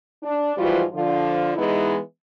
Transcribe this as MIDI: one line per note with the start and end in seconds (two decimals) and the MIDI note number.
0.23 0.53 62
0.58 0.83 44
0.58 0.83 52
0.58 0.83 53
0.58 0.83 55
0.58 0.83 65
0.58 0.83 66
0.93 1.51 50
0.93 1.51 53
0.93 1.51 65
1.56 1.97 52
1.56 1.97 56
1.56 1.97 59
1.56 1.97 63
1.56 1.97 64
1.56 1.97 71